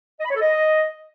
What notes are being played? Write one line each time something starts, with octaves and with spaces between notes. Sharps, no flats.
D#5
B5
C#5
A4
D#5